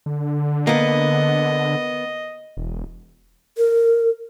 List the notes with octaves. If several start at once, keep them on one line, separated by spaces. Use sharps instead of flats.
D3
A#3 B3 D#5
E1
A#4